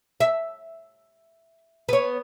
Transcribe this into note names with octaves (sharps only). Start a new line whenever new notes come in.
E5
B3 C#5